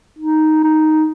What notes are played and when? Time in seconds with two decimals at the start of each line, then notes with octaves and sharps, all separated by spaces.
0.19 D#4
0.64 D#4